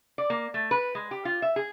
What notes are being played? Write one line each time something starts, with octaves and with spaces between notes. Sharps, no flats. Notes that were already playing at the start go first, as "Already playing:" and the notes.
D5
A#3
A3
B4
G#3
G4
F4
E5
G#4